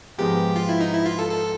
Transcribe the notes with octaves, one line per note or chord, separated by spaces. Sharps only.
G#2 F3 G#3 B3 D#4 G4
F4
E4
D#4
E4
F4
A4
A4